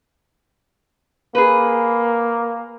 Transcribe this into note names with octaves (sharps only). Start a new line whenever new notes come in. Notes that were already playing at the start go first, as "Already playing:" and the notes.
A#3 G#4 B4